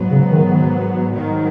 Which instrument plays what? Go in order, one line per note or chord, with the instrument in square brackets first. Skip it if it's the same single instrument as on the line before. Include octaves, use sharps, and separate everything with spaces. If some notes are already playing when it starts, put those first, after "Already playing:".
Already playing: [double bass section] G#2 F#3 B3
[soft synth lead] C#3
D#3
[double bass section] G#2 D#3 F#3